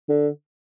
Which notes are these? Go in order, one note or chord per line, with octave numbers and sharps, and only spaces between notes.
D3